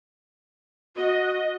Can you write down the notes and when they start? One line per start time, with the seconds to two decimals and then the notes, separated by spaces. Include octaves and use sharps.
0.96 F#4 D#5